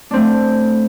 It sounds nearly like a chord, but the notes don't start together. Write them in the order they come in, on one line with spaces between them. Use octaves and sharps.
D4 C4 A3